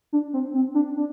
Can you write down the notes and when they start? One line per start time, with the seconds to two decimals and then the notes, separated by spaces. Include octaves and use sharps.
0.13 D4
0.33 C4
0.54 C4
0.74 D4
0.96 D4